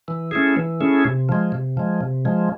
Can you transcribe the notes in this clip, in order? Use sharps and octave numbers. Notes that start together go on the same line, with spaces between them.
E3
A3 C#4 E4 G#4
E3
A3 C#4 E4 G#4
C3
F3 G#3
C3
F3 G#3
C3
F3 G#3